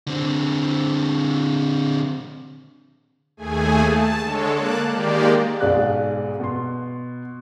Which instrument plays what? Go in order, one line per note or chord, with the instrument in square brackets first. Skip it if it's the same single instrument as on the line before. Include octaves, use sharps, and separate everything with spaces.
[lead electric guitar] D3 C4
[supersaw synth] D#2 A3 G#4 G#5
A5
D3 G#3 A4 C#5
A#3 A5 D6 F#6
D#3 G#3 A#3 G4 D5
[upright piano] B1 G#2 G#4 D5 F5 F#6
B2 C6